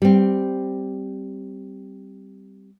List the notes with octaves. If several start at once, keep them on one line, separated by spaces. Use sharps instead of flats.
G3 C4